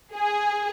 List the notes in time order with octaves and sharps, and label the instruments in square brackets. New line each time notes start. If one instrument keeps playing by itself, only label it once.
[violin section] G#4